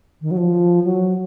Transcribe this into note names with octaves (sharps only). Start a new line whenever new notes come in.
D#3
F#3
F3
F#3